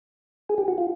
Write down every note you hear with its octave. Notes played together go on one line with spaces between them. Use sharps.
G#4
G4
F#4
F4